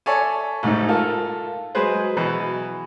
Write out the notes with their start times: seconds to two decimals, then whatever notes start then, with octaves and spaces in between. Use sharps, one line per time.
0.06 A4 C#5 D5 E5 G#5
0.63 A1 G#2 D#4
0.88 F4 A4 A#4
1.75 F#3 G#3 G#4 B4 C5
2.17 B2 E3 F#3